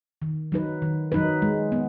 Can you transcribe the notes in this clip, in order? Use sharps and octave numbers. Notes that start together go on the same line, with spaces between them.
D#3
F#3 D#4 B4
D#3
F#3 D#4 B4
G#3
B3